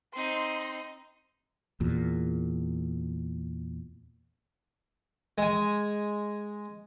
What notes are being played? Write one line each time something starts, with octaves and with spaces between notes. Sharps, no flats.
C4 D#4 C6
E2 A#2
G#3 G#5